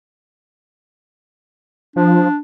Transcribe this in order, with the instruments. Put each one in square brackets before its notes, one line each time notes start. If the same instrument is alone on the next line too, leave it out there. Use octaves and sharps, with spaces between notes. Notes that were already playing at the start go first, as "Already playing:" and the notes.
[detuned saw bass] F3 [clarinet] D4